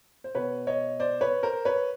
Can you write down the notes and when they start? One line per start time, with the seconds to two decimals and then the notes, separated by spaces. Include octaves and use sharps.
0.24 C5
0.35 B2 B4 C#5
0.67 C#5 D#5
1.00 C5 D5
1.21 B4 C#5
1.43 A#4 C5
1.65 B4 C#5